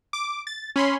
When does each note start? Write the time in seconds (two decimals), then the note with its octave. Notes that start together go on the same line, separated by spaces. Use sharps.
0.13 D6
0.47 A6
0.76 C#4 B5 C6